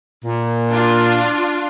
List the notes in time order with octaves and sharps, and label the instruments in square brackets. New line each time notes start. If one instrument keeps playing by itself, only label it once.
[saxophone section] A#2
[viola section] D4 F4